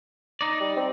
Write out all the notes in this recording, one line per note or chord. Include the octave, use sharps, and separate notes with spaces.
D#4 D5
G3
C4